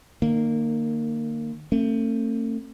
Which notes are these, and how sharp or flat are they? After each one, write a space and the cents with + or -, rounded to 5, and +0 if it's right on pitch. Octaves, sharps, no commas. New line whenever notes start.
D#3 -40 A#3 -15
A3 +35 C#4 -45